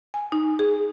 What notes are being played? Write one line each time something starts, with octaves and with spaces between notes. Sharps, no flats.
G#5
D#4
G#4